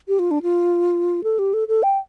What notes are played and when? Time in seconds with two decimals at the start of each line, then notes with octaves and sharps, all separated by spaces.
0.08 G4
0.19 F4
0.31 D4
0.43 F4
1.24 A4
1.39 G4
1.54 A4
1.68 A4
1.83 G5